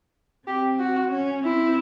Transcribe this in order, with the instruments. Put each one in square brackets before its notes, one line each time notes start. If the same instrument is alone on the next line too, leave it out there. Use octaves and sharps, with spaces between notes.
[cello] C4 [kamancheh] G4
[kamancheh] F#4
[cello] C#4
[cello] C4 [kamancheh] E4